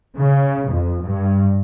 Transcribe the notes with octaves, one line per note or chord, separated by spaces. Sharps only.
C#3
F2
G2